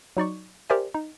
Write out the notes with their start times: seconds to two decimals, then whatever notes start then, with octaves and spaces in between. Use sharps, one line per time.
0.17 F#3 D#4 D5 C#6
0.70 G4 A#4 C5 D5 E5 G#5
0.94 D#4